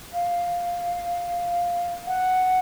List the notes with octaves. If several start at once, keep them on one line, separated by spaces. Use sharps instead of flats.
F5
F#5